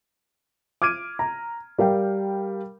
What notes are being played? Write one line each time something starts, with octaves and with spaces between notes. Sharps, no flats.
D6 F6 G#6 D7 D#7
A#5
G3 A#4 F5 G5